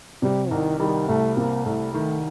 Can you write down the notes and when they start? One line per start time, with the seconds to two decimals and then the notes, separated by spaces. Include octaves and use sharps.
0.22 C3 G3
0.51 C2 D#3
0.80 D#3 G3
1.08 C2 A3
1.37 C3 A#3
1.65 C2 A3
1.93 D#3 A3